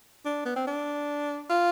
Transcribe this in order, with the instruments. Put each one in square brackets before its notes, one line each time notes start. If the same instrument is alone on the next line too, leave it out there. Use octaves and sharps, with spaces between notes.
[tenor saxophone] D4
B3
C4
D4
F4